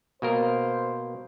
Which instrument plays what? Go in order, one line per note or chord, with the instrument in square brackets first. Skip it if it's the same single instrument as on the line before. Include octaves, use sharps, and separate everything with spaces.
[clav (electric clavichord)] B2 A#3 A#4 [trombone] C5